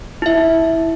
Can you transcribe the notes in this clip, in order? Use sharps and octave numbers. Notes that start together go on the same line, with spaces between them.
E4 E5